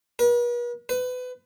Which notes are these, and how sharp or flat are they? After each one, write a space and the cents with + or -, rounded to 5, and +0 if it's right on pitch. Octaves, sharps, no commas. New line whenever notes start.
B4 -45
B4 +25